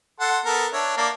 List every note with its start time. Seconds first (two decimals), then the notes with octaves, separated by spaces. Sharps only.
0.20 A4 F#5 C6
0.46 B3 A4 A#4
0.73 D4 C#5 E5
0.97 A#3 D5 A5